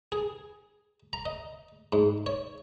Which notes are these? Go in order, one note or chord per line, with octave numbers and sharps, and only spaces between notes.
G#4
A#5
D#5
G#2
C#5